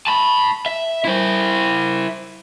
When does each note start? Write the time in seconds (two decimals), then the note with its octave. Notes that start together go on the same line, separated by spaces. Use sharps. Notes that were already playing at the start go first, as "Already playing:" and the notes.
0.07 A5 B5
0.66 E5
1.05 E4 C5